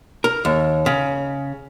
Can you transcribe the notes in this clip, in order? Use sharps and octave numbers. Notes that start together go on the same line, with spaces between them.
A#4
D#2
C#3